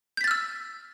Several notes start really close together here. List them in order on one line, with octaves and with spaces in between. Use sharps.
G6 B6 A6 F6 E6